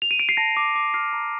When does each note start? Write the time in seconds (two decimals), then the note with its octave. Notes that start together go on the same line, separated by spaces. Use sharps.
0.02 F7
0.11 D#7
0.19 D7
0.29 C7
0.37 A5 A#6
0.57 D6
0.76 D6
0.94 F6 C7
1.13 A#5